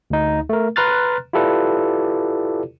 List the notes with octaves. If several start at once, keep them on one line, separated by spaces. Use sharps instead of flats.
D2 D#4
A3 A#4
B4 A#5 C6 F6 F#6 A6
E4 F4 G4 A4 B4 D5